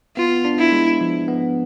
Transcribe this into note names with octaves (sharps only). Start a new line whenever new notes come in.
B3 F4
D4
E4
G#3
F3
B3